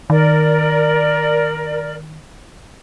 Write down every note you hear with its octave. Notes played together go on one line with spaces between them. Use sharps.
D#3 A#4 D5